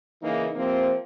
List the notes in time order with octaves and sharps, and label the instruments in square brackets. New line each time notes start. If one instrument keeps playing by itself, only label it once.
[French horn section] C#3 E3 A#3 D#4
C3 F3 A#3 C4